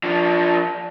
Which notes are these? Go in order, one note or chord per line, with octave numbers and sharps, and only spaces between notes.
F3 D4